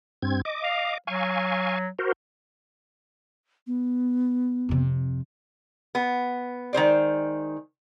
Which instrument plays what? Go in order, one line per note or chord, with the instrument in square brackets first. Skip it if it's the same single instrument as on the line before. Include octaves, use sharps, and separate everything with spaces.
[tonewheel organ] G2 C4 G#6
D#5 D6
[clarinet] F5
[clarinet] F#3 [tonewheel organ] F5 G#5 C#6
[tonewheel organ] F#4 A#4 C5
[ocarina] B3
[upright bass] F2 C3
[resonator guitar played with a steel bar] B3
D#3 G#3 C5 D5